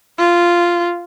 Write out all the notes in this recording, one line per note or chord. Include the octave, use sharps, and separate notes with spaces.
F4